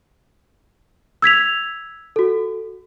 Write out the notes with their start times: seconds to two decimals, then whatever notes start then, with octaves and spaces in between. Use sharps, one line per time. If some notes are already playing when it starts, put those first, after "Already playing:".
1.22 E6 G#6 B6 F7
2.16 F#4 A4